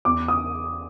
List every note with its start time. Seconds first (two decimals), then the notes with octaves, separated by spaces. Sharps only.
0.05 E2 D6
0.28 D#6